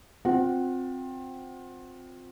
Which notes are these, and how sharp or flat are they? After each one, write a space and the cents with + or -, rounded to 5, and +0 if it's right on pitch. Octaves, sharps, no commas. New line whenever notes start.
C4 +0 F4 +30 F#5 +0